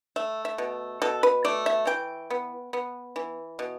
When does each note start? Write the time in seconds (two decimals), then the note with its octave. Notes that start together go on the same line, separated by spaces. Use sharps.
0.16 A3 E5
0.45 E5
0.58 B2
1.02 B2 A4
1.23 B4
1.45 A3 D5
1.66 E5
1.87 E3 G5
2.30 B3
2.73 B3
3.16 E3
3.59 B2